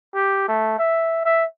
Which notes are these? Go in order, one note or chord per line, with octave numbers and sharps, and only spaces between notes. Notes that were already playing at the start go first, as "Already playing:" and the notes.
G4
A3
E5
E5